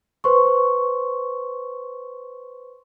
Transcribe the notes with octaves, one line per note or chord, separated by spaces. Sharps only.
B4 C5 C6 C#6